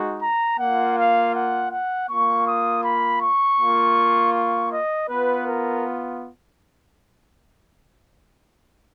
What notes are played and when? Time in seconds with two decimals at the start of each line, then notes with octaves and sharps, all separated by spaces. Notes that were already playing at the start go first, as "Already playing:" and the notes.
Already playing: G#3 D#4 F#4
0.22 A#5
0.59 A#3 F4 F#5
0.97 F5
1.35 F#5
1.72 F#5
2.09 A#3 F4 C#6
2.47 D#6
2.84 B5
3.21 C#6
3.59 A#3 F4
4.34 C#6
4.71 D#5
5.08 B3 F4 B4
5.46 A#4